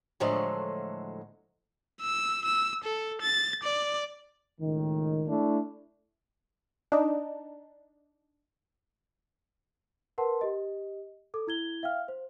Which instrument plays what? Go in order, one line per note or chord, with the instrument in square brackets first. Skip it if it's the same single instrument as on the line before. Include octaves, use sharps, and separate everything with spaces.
[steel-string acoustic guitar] A2 D3 F3 F#3 G#3 A3
[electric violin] E6
E6
A4
A6
D5
[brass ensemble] C#2 A2 D#3
[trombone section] A3 D4 E4
[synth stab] D4 D#4
[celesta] A#4 B4 F#5 A5 C6
G4 D#5
A4 D6
E4 G#6 G7
E5 F5 G5 F6
C5